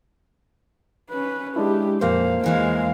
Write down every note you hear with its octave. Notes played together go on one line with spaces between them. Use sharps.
C#4 B4
G#3 D4 E4 G4
F2 A#2 A#3 C4 C5 F5
E2 E3 G#3 A#4 F5